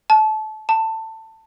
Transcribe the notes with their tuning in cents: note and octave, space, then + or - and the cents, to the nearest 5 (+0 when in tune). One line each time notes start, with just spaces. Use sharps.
A5 -25
A5 +20